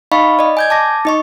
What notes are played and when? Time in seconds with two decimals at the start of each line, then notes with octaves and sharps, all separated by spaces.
0.12 D#4 D#5 F5 B5 C#6
0.39 D5 D#5
0.57 G#5 G6 G#6
0.70 A5 D6 A#6
1.05 D#4 D#5 C#6